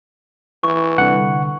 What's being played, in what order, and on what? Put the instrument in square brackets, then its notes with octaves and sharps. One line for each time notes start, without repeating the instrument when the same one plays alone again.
[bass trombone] E3 [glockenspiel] C#6
[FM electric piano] C2 D3 [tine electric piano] F#5